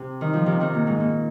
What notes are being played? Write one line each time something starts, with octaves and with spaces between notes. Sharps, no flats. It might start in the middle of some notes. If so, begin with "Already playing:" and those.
Already playing: C3
D#3
F3
C3 D#3
C3 D#3
A#2
G#2
A#2